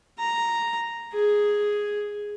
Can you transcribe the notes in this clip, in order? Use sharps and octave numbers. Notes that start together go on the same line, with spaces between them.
A#5
G#4